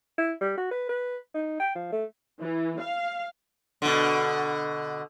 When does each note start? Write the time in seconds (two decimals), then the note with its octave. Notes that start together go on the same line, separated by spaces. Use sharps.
0.18 E4
0.41 G3
0.57 F#4
0.71 B4
0.89 B4
1.34 D#4
1.60 G5
1.75 F3
1.92 A3
2.40 E3
2.80 F5
3.82 B2 D3